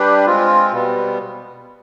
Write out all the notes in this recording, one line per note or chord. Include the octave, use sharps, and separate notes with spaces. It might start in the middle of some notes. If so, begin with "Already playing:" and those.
Already playing: G3 D4 G4 B4
G#3 C4 F4
B2 G3 B3